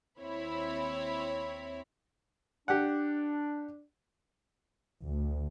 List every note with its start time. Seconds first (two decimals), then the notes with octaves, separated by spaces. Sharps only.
0.20 D#2 C4 E4 C#5 B5
2.68 D4 G4 F#5
5.02 D2